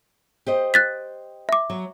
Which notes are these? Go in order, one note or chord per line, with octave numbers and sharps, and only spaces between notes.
G4 C5 D#5
F#6 A6 B6
E5 D6
F#3